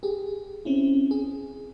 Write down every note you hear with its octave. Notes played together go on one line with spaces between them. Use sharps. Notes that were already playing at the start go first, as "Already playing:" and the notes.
G4 G#4
C4 C#4 E4
G#4